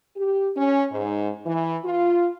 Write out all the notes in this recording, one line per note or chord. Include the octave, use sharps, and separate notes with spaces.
G4
C#4
G#2
E3
F4